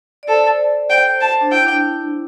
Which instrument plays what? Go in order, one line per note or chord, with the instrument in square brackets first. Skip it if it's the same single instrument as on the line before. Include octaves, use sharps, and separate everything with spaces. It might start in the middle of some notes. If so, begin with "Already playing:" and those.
[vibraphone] D5
[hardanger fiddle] A4 [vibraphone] C5
[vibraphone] C5 [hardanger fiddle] G5
[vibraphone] C5 [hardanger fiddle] A5
[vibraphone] C5
D4
[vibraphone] E4 [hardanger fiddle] G5
[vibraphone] D4